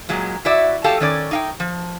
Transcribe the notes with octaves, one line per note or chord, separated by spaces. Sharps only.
A#2 F#3 G#3
E4 F#4 D5 E5
F#4 G4 A4 F5 A5
D#3 C#4 D5
D#4 F5 G5
F3